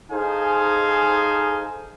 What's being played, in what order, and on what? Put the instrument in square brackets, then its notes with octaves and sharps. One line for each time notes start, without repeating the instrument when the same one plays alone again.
[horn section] D#4 G#4 A4 C5 F5 G#5